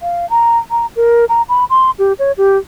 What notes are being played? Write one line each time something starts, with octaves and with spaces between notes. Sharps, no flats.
F5
A#5
A#5
A#4
A#5
B5
C6
G4
C#5
G4